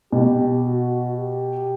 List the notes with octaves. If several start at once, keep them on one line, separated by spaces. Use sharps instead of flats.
B2 G4
F#4
G4